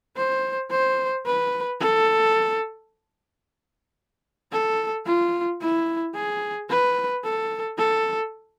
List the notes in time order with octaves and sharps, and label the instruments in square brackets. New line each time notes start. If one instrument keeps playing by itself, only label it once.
[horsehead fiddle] C5
C5
B4
A4
A4
F4
E4
G#4
B4
A4
A4